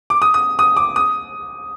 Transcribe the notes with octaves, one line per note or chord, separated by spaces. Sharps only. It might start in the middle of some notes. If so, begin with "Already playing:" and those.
D6
D#6
D#6
D#6
D6
D#6